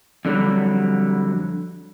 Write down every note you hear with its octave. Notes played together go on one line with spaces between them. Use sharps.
F2 D3 F#3 G3